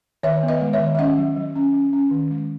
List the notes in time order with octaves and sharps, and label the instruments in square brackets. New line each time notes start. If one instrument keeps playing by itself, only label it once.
[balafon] D#3 C#5 E5
B3
B4 D#5
G#3
C#5 E5
D#3
E5
C#4 D#5 F#5
F#3
F#3
C#4
C#4
C#4
D#3
G#3